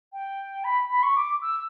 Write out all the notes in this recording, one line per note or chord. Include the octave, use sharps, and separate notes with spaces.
G5
B5
B5
C#6
D6
E6